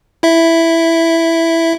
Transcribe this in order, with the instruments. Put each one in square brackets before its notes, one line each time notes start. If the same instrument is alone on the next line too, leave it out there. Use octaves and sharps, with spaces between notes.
[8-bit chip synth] E4 E5